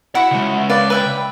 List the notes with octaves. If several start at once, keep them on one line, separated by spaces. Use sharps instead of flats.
E4 F#4 E5 F#5
C#3 G#3
B4 D5 F5
B4 E5 G5